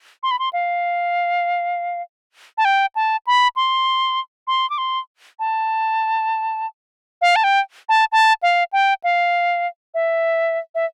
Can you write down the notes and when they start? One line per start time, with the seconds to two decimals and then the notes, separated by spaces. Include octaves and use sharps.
0.23 C6
0.31 B5
0.39 C6
0.53 F5
2.58 A5
2.65 G5
2.95 A5
3.27 B5
3.56 C6
4.47 C6
4.70 D6
4.78 C6
5.39 A5
7.22 F5
7.36 A5
7.44 G5
7.89 A5
8.12 A5
8.43 F5
8.73 G5
9.04 F5
9.94 E5
10.75 E5